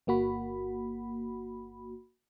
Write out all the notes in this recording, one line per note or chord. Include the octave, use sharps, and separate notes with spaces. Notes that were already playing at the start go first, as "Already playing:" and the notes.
G1 A#3 F#4 B5